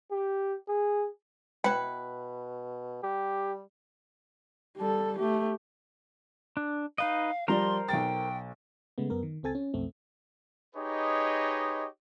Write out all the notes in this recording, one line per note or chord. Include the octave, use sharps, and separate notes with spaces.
G4
G#4
B2 E4 B4 G5
G3 G4
G3 A4
A3 G4
D4
D#4 B4 D#5 F5
F3 G3 A#4 C5 D5 A#5 C6
B1 G5 A6
C#3 G#3 A3 B3
F#2 B3 A#4
D#3
C#2 C4 A4 G#5 A6
C#4
B1 F2 A3 C4
D#4 G4 G#4 B4 C#5 D#5